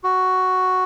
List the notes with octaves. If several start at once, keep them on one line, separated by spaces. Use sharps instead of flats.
F#4